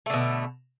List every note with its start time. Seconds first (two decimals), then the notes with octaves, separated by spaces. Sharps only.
0.06 A3
0.10 D3
0.14 B2